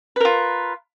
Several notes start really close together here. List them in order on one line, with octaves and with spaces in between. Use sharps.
B4 A#4 F4